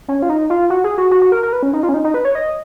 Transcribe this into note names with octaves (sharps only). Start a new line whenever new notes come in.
C#4
F4
D#4
F4
F#4
G#4
F#4
F#4
F#4
A#4
A#4
B4
C#4
D#4
F4
C#4
D#4
D#4
B4
C#5
D#5